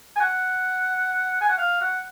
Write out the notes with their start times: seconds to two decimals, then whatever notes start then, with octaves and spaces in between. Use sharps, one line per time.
0.16 G#5
0.20 F#5
1.41 G#5
1.49 F#5
1.58 F5
1.81 F#5